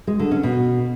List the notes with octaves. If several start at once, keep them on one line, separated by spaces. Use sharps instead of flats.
G#3
D3
C#4
B2